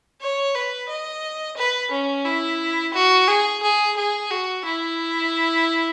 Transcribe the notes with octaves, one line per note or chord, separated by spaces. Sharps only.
C#5
B4
D#5
B4
C#4
E4
F#4
G#4
G#4
G#4
F#4
E4